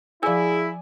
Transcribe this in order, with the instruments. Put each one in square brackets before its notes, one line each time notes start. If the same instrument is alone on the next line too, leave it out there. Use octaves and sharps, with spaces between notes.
[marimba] F3 E6 [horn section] E4 [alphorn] G#4 [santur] D5 G#5